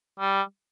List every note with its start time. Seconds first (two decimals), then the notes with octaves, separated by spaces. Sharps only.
0.20 G3